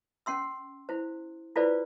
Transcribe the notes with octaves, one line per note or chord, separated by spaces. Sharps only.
C#4 F#5 C6 E6
E4 C5
E4 F4 A4 B4 C5 D5